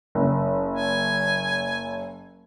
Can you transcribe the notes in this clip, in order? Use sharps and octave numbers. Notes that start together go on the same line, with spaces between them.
F#1
G#5